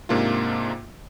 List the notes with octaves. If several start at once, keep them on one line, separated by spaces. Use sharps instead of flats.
G#2 C3 A#3 D4 F4